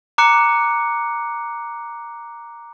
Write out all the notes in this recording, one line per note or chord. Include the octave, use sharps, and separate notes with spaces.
A#5 D6 F#6 C#7